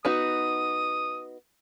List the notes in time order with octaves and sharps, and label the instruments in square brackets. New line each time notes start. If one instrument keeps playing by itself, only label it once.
[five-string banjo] B3 D#4 F#4 [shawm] D#6